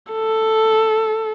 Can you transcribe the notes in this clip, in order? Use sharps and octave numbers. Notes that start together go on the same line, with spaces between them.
A4